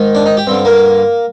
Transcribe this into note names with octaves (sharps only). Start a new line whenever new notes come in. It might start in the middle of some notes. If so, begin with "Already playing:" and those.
Already playing: G#2 D#3
D4
D#4
G4
G2 D3 C4
A#3